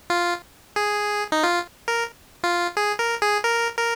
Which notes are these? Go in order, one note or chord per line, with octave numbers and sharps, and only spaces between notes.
F4
G#4
D#4
F4
A#4
F4
G#4
A#4
G#4
A#4
A#4